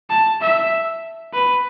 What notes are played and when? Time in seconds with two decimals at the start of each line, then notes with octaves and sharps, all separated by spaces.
0.10 A5
0.41 E5
1.34 B4